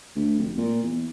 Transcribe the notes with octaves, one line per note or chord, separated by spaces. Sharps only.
D2
F1
A#2
E2